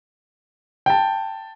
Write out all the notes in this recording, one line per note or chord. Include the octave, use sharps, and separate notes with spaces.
G5 A5